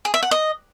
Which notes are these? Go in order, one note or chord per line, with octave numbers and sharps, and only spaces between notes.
G#4
E5
F#5
D#5